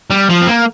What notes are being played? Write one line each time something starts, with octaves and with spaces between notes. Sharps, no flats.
G3
F3
C4
A#3